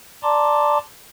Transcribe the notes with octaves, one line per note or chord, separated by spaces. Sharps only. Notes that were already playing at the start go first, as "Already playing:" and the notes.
D5 A5 A#5 C6 D6